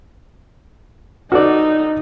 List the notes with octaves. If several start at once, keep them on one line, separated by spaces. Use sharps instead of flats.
D#4 F#4 A4 D5